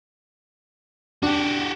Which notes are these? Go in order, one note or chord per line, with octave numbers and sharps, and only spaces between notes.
D4 F#4 G4